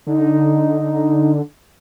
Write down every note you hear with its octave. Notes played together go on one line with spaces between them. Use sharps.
D3 D#4